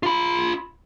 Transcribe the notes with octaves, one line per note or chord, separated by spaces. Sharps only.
F4 B5